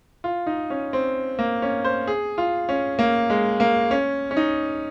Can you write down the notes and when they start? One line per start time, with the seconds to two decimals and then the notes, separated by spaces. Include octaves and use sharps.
0.24 F4
0.47 D#4
0.70 C#4
0.93 C4
1.39 A#3
1.62 C#4
1.84 C5
2.07 G#4
2.38 F4
2.69 C#4
2.99 A#3
3.30 G#3
3.60 A#3
3.91 C#4
4.31 C#4
4.37 D#4